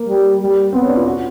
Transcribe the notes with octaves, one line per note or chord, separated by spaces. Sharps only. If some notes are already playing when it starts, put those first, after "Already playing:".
Already playing: A#3
G3
G3
B3 C4
C#4
D4
F4
F#4